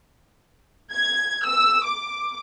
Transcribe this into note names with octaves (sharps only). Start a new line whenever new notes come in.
G#6
E6
D6